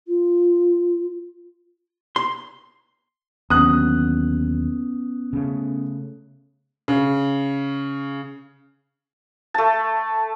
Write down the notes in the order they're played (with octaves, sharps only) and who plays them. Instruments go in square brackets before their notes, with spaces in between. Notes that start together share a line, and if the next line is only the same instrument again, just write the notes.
[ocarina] F4
[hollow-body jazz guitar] C6
[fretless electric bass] D#2 D3 F#3 [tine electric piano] B3 C#4 [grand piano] D#6 F#6
[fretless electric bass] C#3 A3
[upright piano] C#3
[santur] A3 A5